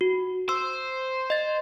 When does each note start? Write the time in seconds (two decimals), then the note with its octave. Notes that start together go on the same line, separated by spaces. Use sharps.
0.01 F#4
0.49 C5 E6
1.30 D#5 A6